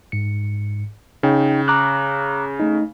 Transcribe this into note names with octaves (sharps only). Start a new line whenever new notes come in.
G#2 C#7
C#3 D#4 G5
A#5 D6 F#6
A3 D#4